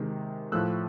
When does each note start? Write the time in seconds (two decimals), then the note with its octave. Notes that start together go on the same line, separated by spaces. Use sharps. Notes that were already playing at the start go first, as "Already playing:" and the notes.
Already playing: C3 D#3 G#3
0.52 A2 F3 A3 E6 F#6